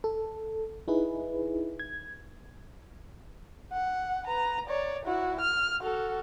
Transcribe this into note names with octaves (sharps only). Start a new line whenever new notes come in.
A4
D#4 E4 G#4 B4
G#6
F#5
B4 A#5
C#5 D5
E4 F#4
F6
F#4 A4